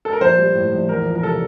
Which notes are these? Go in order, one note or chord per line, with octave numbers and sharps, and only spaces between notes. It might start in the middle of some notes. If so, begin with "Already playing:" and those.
A4
A#4
A#1 C5
G3
A2
A#1
E2 A#4
F3
A#4
C3 A4